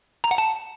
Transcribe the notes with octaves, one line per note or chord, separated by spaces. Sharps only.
A#5
F#5
A5